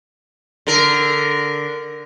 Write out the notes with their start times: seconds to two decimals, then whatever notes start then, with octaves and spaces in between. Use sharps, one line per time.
0.67 D3 A#4